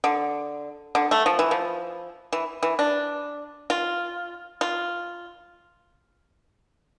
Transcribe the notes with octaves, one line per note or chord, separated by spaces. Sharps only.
D3
D3
A3
F3
E3
F3
E3
E3
D4
F4
F4